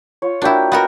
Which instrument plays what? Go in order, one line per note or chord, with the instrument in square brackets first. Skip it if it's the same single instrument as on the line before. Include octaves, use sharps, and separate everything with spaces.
[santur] F4 C#5
[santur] A#3 F#4 G5 [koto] D4 E4
[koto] B3 F#4 A#4 [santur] D#5 F#5